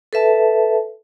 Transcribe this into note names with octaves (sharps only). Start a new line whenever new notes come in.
A4 B4 E5 A5